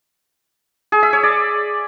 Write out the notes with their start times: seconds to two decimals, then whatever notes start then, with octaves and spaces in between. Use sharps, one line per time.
0.92 G#4
1.03 E5
1.13 C#5
1.23 D5